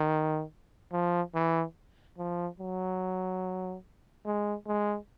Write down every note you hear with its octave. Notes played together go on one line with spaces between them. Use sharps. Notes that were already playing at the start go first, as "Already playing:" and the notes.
Already playing: D#3
F3
E3
F3
F#3
G#3
G#3